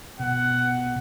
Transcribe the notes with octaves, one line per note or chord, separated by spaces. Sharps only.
B2 F#5